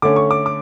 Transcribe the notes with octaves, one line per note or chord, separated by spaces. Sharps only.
D3 A3 C#4 D6
C#6
D6
D6